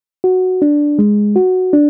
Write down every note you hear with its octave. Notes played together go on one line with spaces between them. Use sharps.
F#4
D4
G#3
F#4
D4